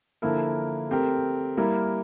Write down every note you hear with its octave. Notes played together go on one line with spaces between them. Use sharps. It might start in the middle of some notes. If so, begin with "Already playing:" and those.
D3 F3 A#3 E4 A#4
A3 C4 G4 A#4
G3 A#3 E4 A#4